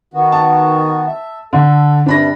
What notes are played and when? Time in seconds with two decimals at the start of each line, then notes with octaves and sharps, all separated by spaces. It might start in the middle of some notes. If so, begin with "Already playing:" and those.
0.14 D#3 B3 F#4
0.32 A5
1.06 E5
1.53 D3 A4
2.06 G2 C3 G3 D4 B5 A#6